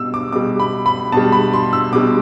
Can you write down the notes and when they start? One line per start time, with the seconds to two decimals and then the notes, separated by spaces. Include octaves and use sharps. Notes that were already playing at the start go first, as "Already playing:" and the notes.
Already playing: B2 G3 E6
0.14 D6
0.32 B2 G3 D6
0.59 B5
0.86 B5
1.12 B2 G3 A5
1.32 B5
1.53 C6
1.73 E6
1.93 B2 G3 D6